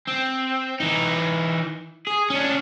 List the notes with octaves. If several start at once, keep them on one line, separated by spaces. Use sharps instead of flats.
C4
E3 D#4
G#4
C#4 D4